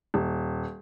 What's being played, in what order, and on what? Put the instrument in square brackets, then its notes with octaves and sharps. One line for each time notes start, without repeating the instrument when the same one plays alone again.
[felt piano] D#1